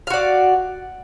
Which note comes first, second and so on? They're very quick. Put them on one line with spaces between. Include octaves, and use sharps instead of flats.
F5 F#4 D5